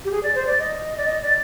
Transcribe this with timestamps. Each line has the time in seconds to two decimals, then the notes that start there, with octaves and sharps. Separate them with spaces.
0.05 G4
0.11 G#4
0.23 D5
0.35 C5
0.47 D5
0.59 D#5
0.97 D5
1.06 D#5
1.22 D5